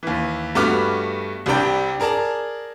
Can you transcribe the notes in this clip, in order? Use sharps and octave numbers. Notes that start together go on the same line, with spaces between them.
D#2 E3
G2 A3 B3 F#4 D6 F6
C2 C3 G3 D4 G5
G#4 A#4 D5 A5 A#5